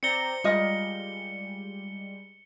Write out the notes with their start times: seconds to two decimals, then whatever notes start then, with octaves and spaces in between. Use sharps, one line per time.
0.03 C4 D5 A#5 C#7 G7
0.44 G3 G#3 F4 A#4 D#5